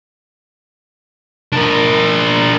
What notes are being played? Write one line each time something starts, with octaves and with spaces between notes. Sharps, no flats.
D4 A#4